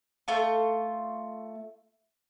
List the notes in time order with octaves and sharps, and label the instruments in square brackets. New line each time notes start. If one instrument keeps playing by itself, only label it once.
[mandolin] A3 F4 C#6